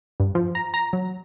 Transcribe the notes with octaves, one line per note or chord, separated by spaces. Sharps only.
G2
F3
A#5
A#5
F#3